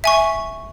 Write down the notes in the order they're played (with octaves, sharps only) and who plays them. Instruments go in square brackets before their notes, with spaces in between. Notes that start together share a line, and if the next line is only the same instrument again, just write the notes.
[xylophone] E5 G#5 C#6